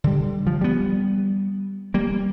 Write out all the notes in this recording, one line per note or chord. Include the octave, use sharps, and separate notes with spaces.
D3 G3
F3
G3 B3
G3 A#3